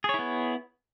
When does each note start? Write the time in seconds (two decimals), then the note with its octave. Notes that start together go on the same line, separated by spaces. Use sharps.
0.04 G#4
0.09 C#5
0.14 E4
0.19 B3